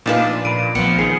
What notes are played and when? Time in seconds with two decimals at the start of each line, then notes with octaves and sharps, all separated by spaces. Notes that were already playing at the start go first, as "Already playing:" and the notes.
0.06 A#2 F3 D4 D#4 F4 B4
0.45 A#2 B5 D7 D#7
0.75 A#1 F3 B3 C#7
0.99 D#3 G#4 C7